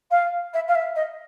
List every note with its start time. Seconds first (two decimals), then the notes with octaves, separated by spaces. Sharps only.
0.11 F5
0.53 E5
0.68 F5
0.75 E5
0.95 D#5